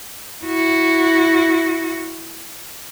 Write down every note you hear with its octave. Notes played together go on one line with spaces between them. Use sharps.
E4 F#4